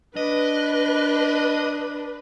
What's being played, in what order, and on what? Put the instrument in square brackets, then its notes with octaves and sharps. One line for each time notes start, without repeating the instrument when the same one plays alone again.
[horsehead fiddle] D4 [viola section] B4 [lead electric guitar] D#5